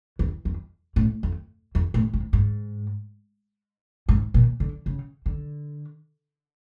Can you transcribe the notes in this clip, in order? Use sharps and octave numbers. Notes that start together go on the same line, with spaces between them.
E2
F2
A2
F2
F2
A2
G#2
G#2
G#2
A#2
D3
C#3
D3